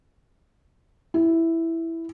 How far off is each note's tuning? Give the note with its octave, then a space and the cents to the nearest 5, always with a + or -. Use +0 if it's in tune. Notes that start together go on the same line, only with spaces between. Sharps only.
E4 +0